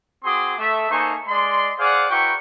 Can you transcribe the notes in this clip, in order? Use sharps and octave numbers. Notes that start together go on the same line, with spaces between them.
C4 F#4 G#4 C6 D6 D#6
A3 E5
A#3 D#4 A4 C5 G#5 C#6
G#3 D5 D#5 C6
G#4 C5 D5 F5 F#5 D6
E4 F#4 B4 G5 A#5 C#6